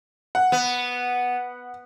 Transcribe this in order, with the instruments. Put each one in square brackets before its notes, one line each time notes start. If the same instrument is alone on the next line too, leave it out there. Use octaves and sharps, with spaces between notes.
[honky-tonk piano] F#5
[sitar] B3